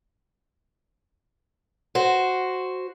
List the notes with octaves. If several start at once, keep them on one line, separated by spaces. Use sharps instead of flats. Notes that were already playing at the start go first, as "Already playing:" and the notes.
F#4 C5